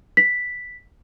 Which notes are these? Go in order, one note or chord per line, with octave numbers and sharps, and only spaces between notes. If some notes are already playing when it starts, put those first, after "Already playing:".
B6